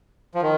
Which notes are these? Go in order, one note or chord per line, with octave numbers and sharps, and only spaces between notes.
F3
D#3